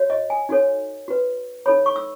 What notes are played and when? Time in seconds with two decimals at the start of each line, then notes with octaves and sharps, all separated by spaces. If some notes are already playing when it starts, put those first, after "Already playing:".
Already playing: F#4 C#5
0.10 D#5
0.30 G#5
0.49 D#4 F#4 A4 C#5
1.08 F#4 B4
1.66 D#4 A4 C#5 B5
1.86 C#6
1.96 E6